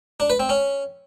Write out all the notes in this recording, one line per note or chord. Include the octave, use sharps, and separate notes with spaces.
D4
B4
C4
C#4